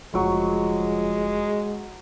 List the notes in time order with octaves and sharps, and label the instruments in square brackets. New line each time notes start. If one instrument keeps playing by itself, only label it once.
[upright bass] F1 D3 [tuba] F3 [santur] F#3 C#6 [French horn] G#3